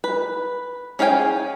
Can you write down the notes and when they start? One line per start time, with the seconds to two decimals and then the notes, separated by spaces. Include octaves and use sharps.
0.04 B4
0.99 C#4 G#4 F5 G5 G#5